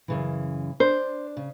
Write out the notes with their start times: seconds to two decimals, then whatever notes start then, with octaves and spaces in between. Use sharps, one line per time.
0.08 F#2 C#3 E3
0.80 D4 C5
1.37 C#3